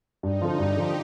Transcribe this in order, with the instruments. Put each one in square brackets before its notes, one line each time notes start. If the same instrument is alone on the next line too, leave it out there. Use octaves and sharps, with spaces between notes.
[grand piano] G2 [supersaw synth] D#4
[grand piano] D3 F3
[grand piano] G2 [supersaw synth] G4
[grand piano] D3 F3